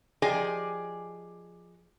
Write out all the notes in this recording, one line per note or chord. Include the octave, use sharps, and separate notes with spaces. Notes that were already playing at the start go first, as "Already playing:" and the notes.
F3 G4 G#4 D5 D#5 G#5